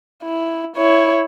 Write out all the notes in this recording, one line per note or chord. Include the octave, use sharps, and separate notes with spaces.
E4
E4 C#5